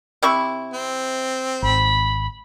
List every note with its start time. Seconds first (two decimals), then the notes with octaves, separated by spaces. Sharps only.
0.23 C3 E4 C#6
0.73 C4
1.63 G#1 B5